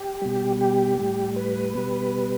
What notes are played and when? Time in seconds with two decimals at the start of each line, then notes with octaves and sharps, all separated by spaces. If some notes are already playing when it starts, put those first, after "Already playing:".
Already playing: G4
0.22 B2 G3
0.61 G4
0.99 A2 G3
1.36 B4
1.75 B2 G3